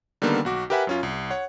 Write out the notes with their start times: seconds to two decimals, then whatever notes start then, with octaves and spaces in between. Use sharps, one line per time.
0.22 D3 D#3 G3 A#3 B3
0.45 B1 F#4 D6
0.70 G4 A#4 B4 E5 F#5 G#5
0.87 F#2 C#4 F4
1.03 C2
1.30 C#5 F#5